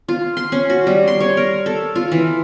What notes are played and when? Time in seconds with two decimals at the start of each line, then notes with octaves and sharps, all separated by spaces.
0.08 F4
0.37 C6
0.52 C#4
0.70 F#4
0.87 G3
1.08 C6
1.20 C#5
1.37 A#4
1.66 A4
1.96 F4
2.12 E3